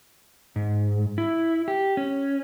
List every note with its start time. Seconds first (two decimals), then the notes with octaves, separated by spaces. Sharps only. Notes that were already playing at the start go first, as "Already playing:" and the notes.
0.56 G#2
1.18 E4
1.68 G4
1.97 C#4